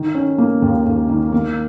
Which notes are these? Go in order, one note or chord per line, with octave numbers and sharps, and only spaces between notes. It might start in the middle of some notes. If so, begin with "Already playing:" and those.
Already playing: D#3
C#4
A#3
D#2
D#2
D#3
A#3